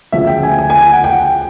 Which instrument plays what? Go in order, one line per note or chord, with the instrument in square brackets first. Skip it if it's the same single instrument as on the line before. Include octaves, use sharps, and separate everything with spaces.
[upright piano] D2 C#3 F3 E5
G5
G#5
G#5
G#5
G#5
F#5
G5